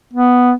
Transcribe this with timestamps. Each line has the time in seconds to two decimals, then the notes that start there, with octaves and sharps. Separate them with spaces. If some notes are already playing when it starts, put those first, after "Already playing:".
0.13 B3